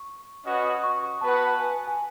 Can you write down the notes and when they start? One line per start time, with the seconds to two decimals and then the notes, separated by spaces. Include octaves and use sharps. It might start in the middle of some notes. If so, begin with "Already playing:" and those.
Already playing: C#6
0.45 C#4 F#4 B4 D#5 F#5
0.65 D#6
0.83 C#6
1.03 C#6
1.21 B3 F#4 B4 F#5 A5
1.60 G#5
1.87 G#5